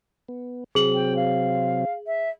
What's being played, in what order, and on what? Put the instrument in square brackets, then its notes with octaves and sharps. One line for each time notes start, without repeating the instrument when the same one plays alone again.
[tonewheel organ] B3
[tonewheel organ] C3 F#3 C4 [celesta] G#4 F#7
[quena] G5
F5
E5